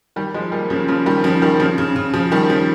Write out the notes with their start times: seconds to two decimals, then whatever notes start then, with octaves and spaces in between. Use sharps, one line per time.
0.16 D#3 G3
0.34 F3 G#3
0.52 G3 A#3
0.70 C#3 F3
0.88 C#3 F3
1.06 D#3 G3
1.24 C#3 F3
1.42 D#3 G3
1.60 C#3 F3
1.78 C#3
1.96 C#3
2.13 C#3 F3
2.31 D#3 G3
2.50 C#3 F3